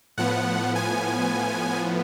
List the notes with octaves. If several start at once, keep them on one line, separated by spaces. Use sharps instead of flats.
A2 F3 B3 F#5
G#5